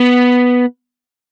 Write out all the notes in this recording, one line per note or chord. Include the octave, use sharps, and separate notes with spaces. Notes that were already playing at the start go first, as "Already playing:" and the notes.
Already playing: B3